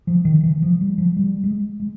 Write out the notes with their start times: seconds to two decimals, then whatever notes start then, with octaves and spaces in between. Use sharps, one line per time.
0.07 F3
0.25 D#3
0.43 E3
0.62 F3
0.81 G3
0.98 F3
1.16 G3
1.44 G#3
1.80 G#3